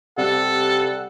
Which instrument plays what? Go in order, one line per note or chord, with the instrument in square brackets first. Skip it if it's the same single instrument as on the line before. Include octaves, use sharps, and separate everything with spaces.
[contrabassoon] C3 [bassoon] G3 [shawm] A4 [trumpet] F#5